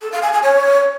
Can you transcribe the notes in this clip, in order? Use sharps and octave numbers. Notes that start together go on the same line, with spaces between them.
A4
F5
G#5
G#5
C#5